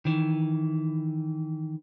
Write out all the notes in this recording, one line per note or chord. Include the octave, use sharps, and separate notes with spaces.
D#3 E3